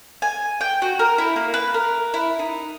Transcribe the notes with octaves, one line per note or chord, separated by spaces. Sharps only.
G#5
G5
F#4
A#4
E4
A#3
B4
A#4
E4
D#4